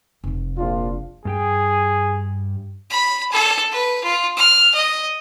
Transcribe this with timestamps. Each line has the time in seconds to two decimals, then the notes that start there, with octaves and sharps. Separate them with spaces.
0.24 F1 F3
0.57 A#1 D4 F4
1.25 G2 G4 G#4 G5
2.90 B5
3.32 A4
3.71 B4
4.04 F4
4.37 F6
4.74 D#5